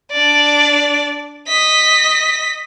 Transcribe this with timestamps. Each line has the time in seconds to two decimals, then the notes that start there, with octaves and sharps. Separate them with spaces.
0.12 D4 D5
1.48 D#5 B6